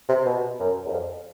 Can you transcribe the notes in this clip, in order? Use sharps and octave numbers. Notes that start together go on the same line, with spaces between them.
C3
B2
F#2
E2
F2